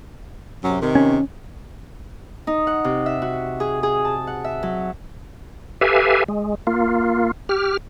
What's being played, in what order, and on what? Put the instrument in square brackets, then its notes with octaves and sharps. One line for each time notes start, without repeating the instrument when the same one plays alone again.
[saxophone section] F#2 C3 F#3
C3 D#3
[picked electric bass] C#4
[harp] D#4
F#5
C3
E5
F#4
G#4
G#4
A5
F#5
E5
F#3
[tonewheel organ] G4 A4 B4 E5 F5 G#5
G#3
A#3 F4
G4 F6